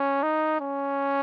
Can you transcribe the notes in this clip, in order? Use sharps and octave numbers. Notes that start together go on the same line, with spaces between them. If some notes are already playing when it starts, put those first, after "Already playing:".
Already playing: C#4
D#4
C#4